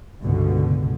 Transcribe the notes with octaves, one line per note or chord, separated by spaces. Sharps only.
C#2 G2 B2 D3